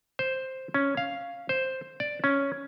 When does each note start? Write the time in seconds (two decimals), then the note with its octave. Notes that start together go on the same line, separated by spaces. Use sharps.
0.19 C5
0.74 C#4
0.97 F5
1.49 C5
2.00 D5
2.24 C#4